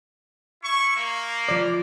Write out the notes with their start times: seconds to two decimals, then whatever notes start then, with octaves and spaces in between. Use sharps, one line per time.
0.63 E4 C#6
0.96 A#3
1.49 F3 D5